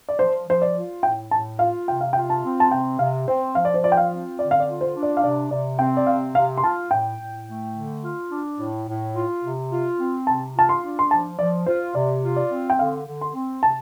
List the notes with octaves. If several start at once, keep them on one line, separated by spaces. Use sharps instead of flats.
D5
F3 C5
F3 C5
D5
F4
A2 G5
A2 A5
F4 F5
C3 G5
F5
F4 G5
A5
C4
A5
C3 G5
C3 F5
C4 C5
F3 F5
D5
C5
F4 D5
G5
F5
C4
D3 D5
F5
D5
F4
C5
D4
D5
F5
C3 D5
C3 D5
C4 G5
D5
C3 F5
C3 F5
C6
F4 A5
A2 G5
A2
A3
D3
F4
D4
A2
A2
F4
C3
F4
C4
C3 A5
F4 A5
C6
D4
C6
F3 A5
F3 D5
F4 C5
C3 D5
F4
D5
C4
G5
D3 F5
D3
C6
C4
C3 A5